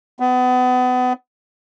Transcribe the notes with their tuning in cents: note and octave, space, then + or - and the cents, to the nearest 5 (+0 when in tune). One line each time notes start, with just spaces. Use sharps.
B3 +30